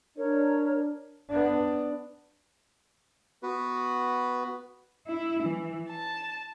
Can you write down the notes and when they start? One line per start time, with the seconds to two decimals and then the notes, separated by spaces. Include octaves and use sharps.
0.18 D4 A#4 C#5
1.29 B3 D4
3.43 B3 F#4 B4
5.06 E4
5.42 E3
5.90 A5